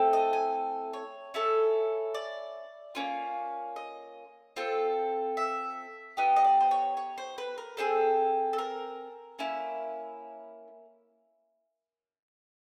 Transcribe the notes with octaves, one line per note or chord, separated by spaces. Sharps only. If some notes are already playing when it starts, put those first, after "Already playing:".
Already playing: A3 C4 E4 A4
D#5
G#5
C#5
C#4 E4 A4
D5
A#3 C#4 F4
D#5
C4 F4 A4
E5
B3 D#4 G4 D#5
D#5
D5
C5
C#5
C#5
C5
B4
A#4
C4 F4 G#4 A4
A4
A#4
A#3 C#4 E4